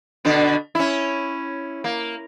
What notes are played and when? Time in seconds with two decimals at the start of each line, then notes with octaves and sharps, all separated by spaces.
0.25 B2 D3 D4
0.75 C#4 E4
1.84 A#3